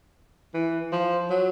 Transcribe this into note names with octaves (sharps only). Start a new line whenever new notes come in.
E3
F3
F#3